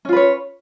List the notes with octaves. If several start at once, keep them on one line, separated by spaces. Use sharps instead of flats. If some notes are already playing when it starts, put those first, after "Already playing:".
C#4 F4 B4 C#5